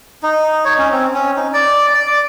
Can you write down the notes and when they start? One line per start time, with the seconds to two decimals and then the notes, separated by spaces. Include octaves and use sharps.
0.23 D#4
0.65 C#5
0.79 C#4
0.92 C4
1.14 C#4
1.36 D#4
1.53 D5
1.94 D5
2.08 D6